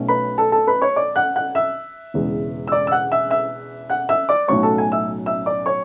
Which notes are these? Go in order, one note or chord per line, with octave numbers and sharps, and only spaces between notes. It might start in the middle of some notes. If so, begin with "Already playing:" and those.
Already playing: B1 B2 A3 C#4
B4 B5
A4 A5
A4 A5
B4 B5
C#5 C#6
D5 D6
F#5 F#6
F#5 F#6
E5 E6
E1 E2 C#3 E3 G#3
E6
D5 D6
E6
F#5 F#6
E5 E6
E5 E6
F#5 F#6
E5 E6
D5 D6
B1 A2 F#3 C#4 C#5 C#6
A4 A5
G#5
E5 E6
E5 E6
D5 D6
C#5 C#6